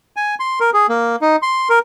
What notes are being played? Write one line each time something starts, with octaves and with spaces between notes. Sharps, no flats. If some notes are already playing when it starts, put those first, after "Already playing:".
G#5
C6
A#4
G#4
A#3
D#4
C6
A#4